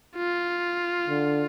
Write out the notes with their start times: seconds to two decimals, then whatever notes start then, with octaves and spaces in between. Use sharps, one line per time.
0.16 F4
1.07 D3